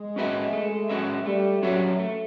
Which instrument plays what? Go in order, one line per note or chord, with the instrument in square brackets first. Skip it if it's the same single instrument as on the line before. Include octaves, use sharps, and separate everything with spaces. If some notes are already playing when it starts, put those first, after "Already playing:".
Already playing: [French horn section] G#3
[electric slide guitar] C#4 F#4 B4 E5
A3
C#4 F#4 B4 E5
[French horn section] G3 [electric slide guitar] A3
[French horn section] F#3 [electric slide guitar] C#4 F#4 B4 E5
[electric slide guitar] A3